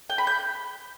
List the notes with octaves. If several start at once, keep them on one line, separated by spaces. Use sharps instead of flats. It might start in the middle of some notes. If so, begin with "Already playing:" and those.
G5
B5
G6